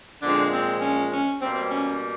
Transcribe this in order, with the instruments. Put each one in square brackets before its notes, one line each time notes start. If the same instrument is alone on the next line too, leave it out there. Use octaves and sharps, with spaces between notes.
[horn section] A#2 D3 F3 G#3 C4 D4
C4
C#4
C#4
B2 G3 A#3 C4
C#4